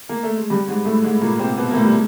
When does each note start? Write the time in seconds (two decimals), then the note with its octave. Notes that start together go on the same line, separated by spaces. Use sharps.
0.09 A#3
0.23 A3
0.37 G#3
0.50 G2 G3
0.68 G#2 G#3
0.85 A2 A3
1.04 G#2 G#3
1.21 A#2 A#3
1.39 C3 C4
1.57 B2 B3
1.71 A#3
1.74 A2 A3
1.85 G3
1.92 G#3